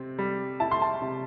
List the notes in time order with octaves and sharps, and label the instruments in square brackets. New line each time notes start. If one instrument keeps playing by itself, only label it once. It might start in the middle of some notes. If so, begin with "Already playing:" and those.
Already playing: [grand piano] C3 C4
G3
E4 A5
C6
A5
C3